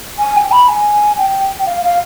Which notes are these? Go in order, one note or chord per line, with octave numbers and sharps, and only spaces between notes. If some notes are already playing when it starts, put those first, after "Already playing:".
G#5
G5
B5
G#5
G5
F5
F5